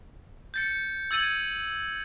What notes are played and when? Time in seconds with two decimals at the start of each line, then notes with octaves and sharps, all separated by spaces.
0.54 G6 A6 C#7
1.11 E6 G#6 A6 D#7 F#7